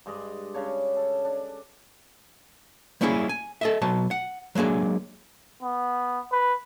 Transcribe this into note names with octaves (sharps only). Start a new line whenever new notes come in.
G2 G#3 D5 D#5
C#3 D4 C#5
A4
D4
G3 A#3 C#4 E4 F#4 G#4
G#5
A4 D#5 E5
B2 F#3 A5
F#5
F#3 G#3 A#3 D4 G#4
B3
B4